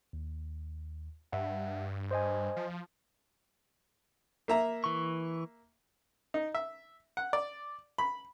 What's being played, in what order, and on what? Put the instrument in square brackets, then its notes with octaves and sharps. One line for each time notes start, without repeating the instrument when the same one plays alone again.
[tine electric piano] D#2
[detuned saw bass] G2 [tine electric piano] E5 F#5
[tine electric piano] C5 D#5 G#5
[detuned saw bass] F3
[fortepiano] A#3 E5 A#5
[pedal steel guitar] E3 C#6
[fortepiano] D#4
E5
F#5
D5
B5